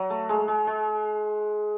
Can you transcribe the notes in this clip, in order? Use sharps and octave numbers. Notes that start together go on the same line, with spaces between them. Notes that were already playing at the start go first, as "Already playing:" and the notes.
Already playing: F#3
A3
G#3
G#3
G#3